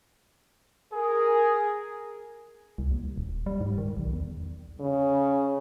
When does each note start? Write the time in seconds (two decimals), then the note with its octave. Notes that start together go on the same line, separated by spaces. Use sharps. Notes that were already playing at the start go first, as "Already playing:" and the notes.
0.92 G#4 A#4
2.78 C2
2.91 D#2
3.18 D#1
3.46 G3
3.61 G#2
3.78 D#3
3.97 B1
4.13 E2
4.80 C#3